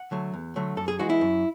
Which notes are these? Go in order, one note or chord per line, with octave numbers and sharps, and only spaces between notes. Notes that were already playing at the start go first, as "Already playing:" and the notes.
Already playing: F#5
D3 F#3 A3
E2
D3 F#3 A3
F#2 A4
G#4
E3 G#3 F#4
E4
F#2